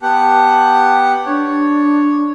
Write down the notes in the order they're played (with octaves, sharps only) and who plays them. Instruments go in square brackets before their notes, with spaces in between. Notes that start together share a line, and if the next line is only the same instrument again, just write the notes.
[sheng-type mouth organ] B3 G4 F#5 [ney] A5
[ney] D4 [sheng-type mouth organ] C#5